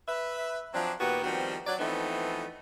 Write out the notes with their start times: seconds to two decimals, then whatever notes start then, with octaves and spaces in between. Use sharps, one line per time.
0.08 B4 E5
0.74 F3 F#3 C4 D4
1.00 A#2 D#3 B3 F#4 G4 B4
1.24 D#3 F3 G3 B3 C4 F#4
1.66 F#3 D5
1.79 E3 F3 A3 B3 C4 D#4